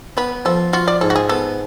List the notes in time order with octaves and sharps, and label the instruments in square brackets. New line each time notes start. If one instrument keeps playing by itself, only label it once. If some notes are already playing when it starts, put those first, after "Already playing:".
[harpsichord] B3 [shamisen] B4
[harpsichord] F3 [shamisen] A4
[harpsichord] F4 [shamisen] F#4
[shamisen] D5
[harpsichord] G#2 [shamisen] A4
[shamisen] F#4
G#4
[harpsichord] B3 [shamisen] A4